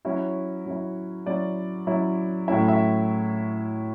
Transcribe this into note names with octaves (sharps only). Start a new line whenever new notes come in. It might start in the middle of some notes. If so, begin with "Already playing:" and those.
F#3 C#4 E4 F#4
F#3 C#4 E4
F#3 C#4 E4 D5
F#3 C#4 E4
A2 F#3 C#4 E4 E5
E5